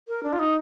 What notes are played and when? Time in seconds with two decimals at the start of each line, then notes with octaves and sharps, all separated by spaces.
0.08 A#4
0.23 D4
0.33 F4
0.39 D#4